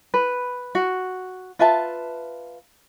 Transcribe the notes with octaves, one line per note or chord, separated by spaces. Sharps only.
B4
F#4
F4 B4 E5 A5